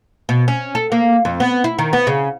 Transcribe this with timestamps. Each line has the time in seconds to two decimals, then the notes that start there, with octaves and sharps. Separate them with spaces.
0.29 B2
0.48 C#4
0.75 A4
0.92 A#3
1.25 F2
1.40 B3
1.64 E4
1.79 D#3
1.93 B3
2.07 C#3